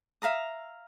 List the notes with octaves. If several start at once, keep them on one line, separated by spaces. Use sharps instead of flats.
E5 F5 A#5 D#6